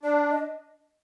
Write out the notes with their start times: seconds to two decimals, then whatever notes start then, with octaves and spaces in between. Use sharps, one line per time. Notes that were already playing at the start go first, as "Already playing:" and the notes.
0.03 D4 D5
0.31 D#5